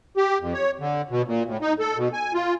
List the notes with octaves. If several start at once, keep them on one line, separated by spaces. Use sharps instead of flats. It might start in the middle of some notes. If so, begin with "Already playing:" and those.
G4
F2
C#5
D3
B2
A#2
A2
D#4
A4
B2
G#5
F4